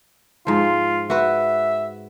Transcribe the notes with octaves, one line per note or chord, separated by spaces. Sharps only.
G#2 F3 F4
F#4 B4 E5